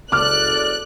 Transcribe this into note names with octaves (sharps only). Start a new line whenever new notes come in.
F#1 C#2 A4 D5 D6 F6 F#6